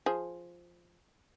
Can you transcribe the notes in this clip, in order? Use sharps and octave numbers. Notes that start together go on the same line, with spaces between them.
F3 G#4